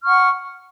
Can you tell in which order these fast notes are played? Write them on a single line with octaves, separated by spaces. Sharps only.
F6 C#6 F#5